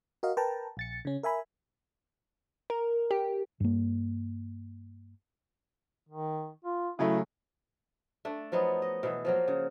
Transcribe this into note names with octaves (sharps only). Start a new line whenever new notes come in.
F#4 A#4 D#5 F5
A#4 B4 G5 A5 A#5
A#1 A6 C#7
C#3 C#4
A#4 E5 G#5 B5
A#4
G4
G2 A#3
D#3
F4
C#3 F#3 A3 E4
A3 D4
F3 F#3 B3 D#4
D#5
B2 E3
F3 F#3 A#3
C#3